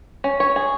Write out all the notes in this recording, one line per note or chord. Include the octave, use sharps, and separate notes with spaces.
C#4
C#5
G#4